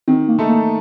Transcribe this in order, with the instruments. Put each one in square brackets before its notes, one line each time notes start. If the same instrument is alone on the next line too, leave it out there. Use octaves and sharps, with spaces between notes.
[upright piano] D#3 [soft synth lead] C4
[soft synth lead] A#3
[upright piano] A3 D#4 A4
[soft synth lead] A#3